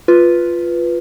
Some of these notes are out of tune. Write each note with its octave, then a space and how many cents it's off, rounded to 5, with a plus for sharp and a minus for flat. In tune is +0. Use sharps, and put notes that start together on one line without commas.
F4 +0 B4 +0